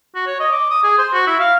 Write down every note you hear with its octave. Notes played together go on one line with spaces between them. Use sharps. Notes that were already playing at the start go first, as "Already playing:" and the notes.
F#4
C#5
D#5
D6
D#6
G#4
C5
F#4
E4
F5